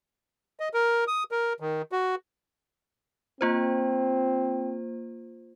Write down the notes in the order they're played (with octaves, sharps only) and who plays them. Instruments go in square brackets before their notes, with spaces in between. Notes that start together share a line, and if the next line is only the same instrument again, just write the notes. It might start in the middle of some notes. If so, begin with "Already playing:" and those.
[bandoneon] D#5
A#4
D#6
A#4
D#3
F#4
[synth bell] A#3 F4 C5 [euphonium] C4